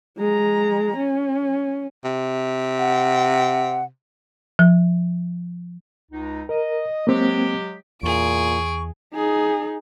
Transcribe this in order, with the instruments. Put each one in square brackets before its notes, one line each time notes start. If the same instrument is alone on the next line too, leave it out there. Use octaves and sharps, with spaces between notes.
[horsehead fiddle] G#3 A#5
C#4
[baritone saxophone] C3
[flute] F#5
[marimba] F3
[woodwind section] C#2 D#4
[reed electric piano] A#4 [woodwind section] D#5
[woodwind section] F#3 G#3 G4 [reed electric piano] A#3 C4
[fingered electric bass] E2 [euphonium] A#2 [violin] G#4 D7 [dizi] C#6
[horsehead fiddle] D#4 G#4